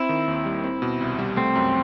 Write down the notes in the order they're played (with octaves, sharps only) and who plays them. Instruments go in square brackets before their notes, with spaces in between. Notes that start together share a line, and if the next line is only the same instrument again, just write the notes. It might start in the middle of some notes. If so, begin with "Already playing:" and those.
Already playing: [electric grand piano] C4 [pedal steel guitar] E4
[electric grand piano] D#3
D#2
G3
C4
B2
C2
G3
[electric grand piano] A3 [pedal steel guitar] C4
[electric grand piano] F#2